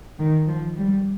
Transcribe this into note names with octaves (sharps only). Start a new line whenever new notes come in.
D#3
F3
G3